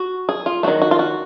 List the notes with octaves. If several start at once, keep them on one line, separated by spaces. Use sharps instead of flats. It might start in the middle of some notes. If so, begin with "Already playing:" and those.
Already playing: F#4
G#4
F4
D#3 F#3 A3 F#4
F#4
F4
F#4